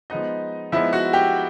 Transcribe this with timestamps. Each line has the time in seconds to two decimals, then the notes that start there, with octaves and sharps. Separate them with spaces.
0.10 F3 G#3 B3 D#4 D#5
0.72 F3 G#3 B3 D#4 E4 E5
0.93 F#4 F#5
1.13 G4 G5